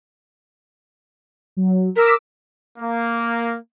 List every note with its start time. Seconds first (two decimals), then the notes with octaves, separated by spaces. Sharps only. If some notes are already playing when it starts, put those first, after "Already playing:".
1.57 F#3
1.96 A#4 D6 E6 B6
2.78 A#3